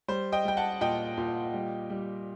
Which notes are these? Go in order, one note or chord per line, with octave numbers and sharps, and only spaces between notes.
G3 C5
D#5 G5
G3 G5
F#5 A5
A#2 D#5 G5
A#2
G3
G3